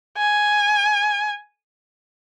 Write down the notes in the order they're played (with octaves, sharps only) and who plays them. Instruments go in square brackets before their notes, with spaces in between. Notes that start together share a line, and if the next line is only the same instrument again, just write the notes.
[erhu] G#5